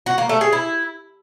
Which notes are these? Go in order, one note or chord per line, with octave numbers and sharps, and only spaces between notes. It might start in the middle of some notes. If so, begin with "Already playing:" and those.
F#4
A#3
A3
G#4
E4